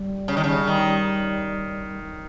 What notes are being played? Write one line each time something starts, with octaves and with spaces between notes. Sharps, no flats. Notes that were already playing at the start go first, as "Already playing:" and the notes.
Already playing: G3
C#3
D#3
C#3
D#3